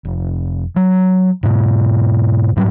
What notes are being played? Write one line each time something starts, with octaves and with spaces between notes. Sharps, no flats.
F1
F#3
G#2 B2
G#2 F#3 G3